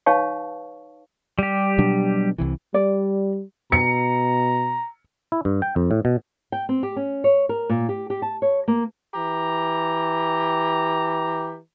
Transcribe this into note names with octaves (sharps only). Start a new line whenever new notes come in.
D#4 B4 C#5 F5 A5 C#6
G3 G4
B2 F#3 D4
C2 C3 E3
G3 D5
B2 A#5 C#7
E4
G2
G5
F2
A2
B2
G5
C4
G4
C#4
C#5
A#4
A#2
G4
G4
A5
C#5
A#3
E3 G4 A#5